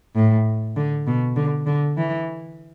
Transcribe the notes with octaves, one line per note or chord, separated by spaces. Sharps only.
A2
D3
B2
D3
D3
E3